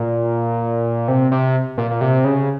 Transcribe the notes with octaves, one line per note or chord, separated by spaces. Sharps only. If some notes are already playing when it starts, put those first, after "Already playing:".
Already playing: A#2
C3
C3
A#2
A#2
C3
C#3